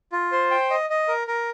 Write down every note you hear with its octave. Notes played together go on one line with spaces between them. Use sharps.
F4
C5
G5
D#5
D#5
A#4
A#4